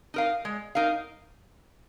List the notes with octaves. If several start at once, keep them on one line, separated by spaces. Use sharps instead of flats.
D#4 A#4 F5
G#3
D#4 A#4 F5